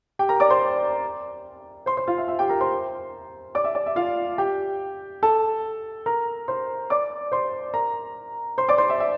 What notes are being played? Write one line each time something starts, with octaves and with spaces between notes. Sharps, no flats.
G4 G5
A#4 A#5
D5 D6
C5 C6
C5 C6
C5 C6
F4 F5
E5
E5
G4 G5
A#4 A#5
C5 C6
D5 D6
E5
D5
E5
F4 F5
G4 G5
A4 A5
A#4 A#5
C5 C6
D5 D6
C5 C6
A#4 A#5
C5 C6
D5 D6
C5 C6
E5
E5